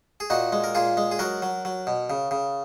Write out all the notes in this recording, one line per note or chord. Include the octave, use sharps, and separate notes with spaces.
G#4
A#2 D#4 F#4
G#3
A#4
A#2 F4 G#4
G#3
G#4
F#3 F#4 A#4
F#3
F#3
B2
C#3
C#3